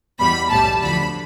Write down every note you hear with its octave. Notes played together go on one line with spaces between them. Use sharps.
E2 B2 G3 B5
B1 A2 G3 A5
D2 D3 F3 B5